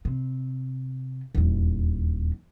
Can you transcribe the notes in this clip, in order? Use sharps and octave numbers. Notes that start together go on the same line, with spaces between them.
C3
D#1 E2